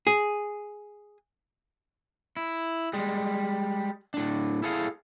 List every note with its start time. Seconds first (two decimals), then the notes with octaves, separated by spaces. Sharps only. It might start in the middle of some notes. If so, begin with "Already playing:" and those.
0.07 G#4
2.37 E4
2.93 G3 G#3
4.14 A2 D4
4.63 E4 G#4 A4 F5